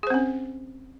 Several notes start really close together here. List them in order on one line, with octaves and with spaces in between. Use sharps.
G#4 C5 C4 C#4